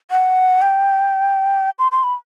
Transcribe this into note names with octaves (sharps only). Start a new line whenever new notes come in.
F#5
G5
C6
C6
B5